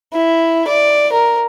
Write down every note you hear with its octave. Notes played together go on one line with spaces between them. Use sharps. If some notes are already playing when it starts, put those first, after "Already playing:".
E4
D5
A#4